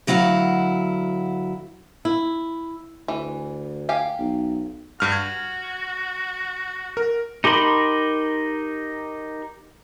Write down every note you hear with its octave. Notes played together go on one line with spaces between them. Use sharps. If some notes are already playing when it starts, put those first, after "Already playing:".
D2 F#3 E4 F5 F#5
E4
D2 E3
G4 F5 G#5
B1
G2 F#4 F6
G#6
A#4
D#4 G4 A#4 B5 C6